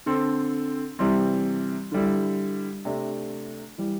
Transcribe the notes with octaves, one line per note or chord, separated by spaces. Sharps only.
D3 C4 A4
C3 E3 G3 C4
D3 G3 E4
C3 A3 D4
E3 G3